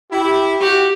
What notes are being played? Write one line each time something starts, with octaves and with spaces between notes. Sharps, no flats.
E4 G4
F#4 G4 G5